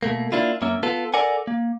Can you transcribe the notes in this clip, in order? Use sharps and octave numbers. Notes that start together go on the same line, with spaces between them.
B2 A3 A#3
A#3 D4 E4 F4
F#2 A#3 C#4 E5
B3 F4 A4
A4 A#4 D5 F#5 G#5
A#3